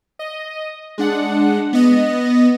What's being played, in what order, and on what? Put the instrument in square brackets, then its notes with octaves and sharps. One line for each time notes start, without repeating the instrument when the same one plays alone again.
[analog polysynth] D#5
G#3 D4 F#5
B3 D#5